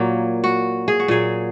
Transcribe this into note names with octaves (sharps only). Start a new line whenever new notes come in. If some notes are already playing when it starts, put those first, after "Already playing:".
Already playing: A#2 F#3 A#3
F#4
G#4
F#4
A#2 F#3 G#4